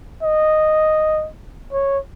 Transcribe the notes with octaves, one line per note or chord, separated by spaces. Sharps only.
D#5
C#5